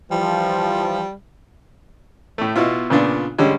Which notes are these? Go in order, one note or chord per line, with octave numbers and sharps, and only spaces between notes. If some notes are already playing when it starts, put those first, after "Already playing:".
E3 F3 G3
A2 A3
B2 B3 E4 F4
A#2 C#3 B3 D4 F4
D3 G3 G#3 C#4